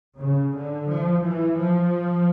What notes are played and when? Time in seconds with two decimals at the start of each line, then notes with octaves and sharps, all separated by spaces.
0.19 C#3
0.54 D3
0.90 F3
1.26 E3
1.61 F3